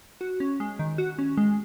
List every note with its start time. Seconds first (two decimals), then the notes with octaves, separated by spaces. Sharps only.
0.21 F#4
0.40 C#4
0.60 G#3
0.79 D#3
0.98 F#4
1.19 C#4
1.37 G#3